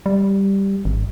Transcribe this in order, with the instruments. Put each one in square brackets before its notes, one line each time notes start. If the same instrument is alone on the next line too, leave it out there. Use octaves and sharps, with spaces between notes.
[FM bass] G3
G#1